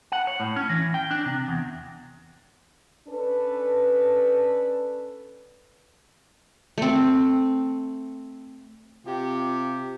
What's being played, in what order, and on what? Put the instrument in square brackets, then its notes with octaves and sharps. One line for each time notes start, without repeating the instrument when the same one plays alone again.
[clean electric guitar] F#5
C#5
A2
C#4
E3
G5
D4
C3
E2
[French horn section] C#4 D4 A4 B4
[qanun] A3 C4
[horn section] C3 F4 G4